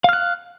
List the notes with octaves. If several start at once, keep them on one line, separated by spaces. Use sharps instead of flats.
F5 F6 F#6